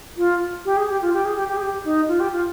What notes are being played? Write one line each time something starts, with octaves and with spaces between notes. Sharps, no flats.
F4
G4
G#4
G4
F4
G4
G#4
G4
G4
G#4
G4
D#4
F4
G4
F4